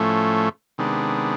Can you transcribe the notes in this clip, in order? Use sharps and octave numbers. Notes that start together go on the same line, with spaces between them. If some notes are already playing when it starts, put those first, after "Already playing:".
Already playing: A2 F3 A3 C#4
C3 D#3 G#3 B3 D4